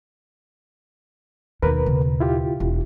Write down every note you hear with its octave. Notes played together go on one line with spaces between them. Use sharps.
D#2 B2 D#4 A#4 B4
C#3
E4 F4 G4
E1